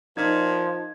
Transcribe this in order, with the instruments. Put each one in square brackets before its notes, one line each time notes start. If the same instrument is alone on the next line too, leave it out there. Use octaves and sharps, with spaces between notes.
[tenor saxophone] A#2 [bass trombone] F3 [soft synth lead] D#4 [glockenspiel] G#6